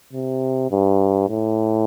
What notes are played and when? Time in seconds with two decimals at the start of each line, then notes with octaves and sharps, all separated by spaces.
0.13 C3
0.71 G2
1.29 A2